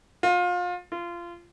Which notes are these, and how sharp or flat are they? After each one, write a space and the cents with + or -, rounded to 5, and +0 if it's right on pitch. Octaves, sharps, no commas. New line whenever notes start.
F4 +30
F4 -20